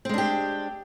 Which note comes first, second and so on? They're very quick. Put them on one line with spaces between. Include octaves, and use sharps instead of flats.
C4 G#3 D4 G4